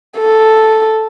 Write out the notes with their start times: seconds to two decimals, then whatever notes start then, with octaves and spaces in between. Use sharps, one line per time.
0.18 A4